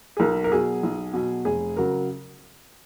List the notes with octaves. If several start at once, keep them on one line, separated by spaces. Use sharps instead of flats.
G#4
B1 A#4
A#4
B2 F#3 G#4
B1
B2 F#3
F1 G#4
C#3 F#3 A#4